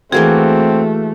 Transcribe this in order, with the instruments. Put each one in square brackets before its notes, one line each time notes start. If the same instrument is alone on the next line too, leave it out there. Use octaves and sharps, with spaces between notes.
[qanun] E3 A#3 F#4 [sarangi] A3 [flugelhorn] C4 [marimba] G#4